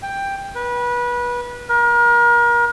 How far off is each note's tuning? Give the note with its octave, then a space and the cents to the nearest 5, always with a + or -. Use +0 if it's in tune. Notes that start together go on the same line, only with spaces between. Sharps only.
G5 +10
B4 -25
A#4 +35